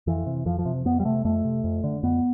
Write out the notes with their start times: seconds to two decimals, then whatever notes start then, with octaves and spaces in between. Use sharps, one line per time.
0.07 F2 E3
0.26 C3
0.46 F2 F3
0.59 F3
0.65 C3
0.85 F2 B3
1.00 G3
1.05 C3 A3
1.25 F2 A3
1.44 C3
1.64 F2
1.84 D3
2.03 F2 B3